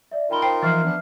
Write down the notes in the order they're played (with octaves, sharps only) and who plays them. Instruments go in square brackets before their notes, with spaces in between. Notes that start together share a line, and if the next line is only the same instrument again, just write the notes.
[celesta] D5 E5
[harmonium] D#4 F4 A#4 [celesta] G5 B5 G7
[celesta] C5 C7 [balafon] G5
[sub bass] E3 [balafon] F3 [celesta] E5 F6 C7
[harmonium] B3 D4